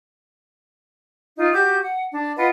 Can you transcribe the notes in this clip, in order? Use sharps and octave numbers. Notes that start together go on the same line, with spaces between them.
D#4 F4
F#4 G4 D6 G6
F#5
D4
F4 B4 D#5 F#5